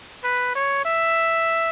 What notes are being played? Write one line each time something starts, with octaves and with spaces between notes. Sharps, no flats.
B4
C#5
E5